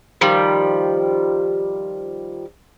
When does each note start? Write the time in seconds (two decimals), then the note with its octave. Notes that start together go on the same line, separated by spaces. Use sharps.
0.21 D#3 F3 G3